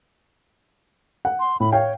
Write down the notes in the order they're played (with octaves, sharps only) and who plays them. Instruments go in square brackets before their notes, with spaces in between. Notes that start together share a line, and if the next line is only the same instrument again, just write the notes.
[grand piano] F#5
[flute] C6
[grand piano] A2 [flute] B5
[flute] C#5 [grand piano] F5 G5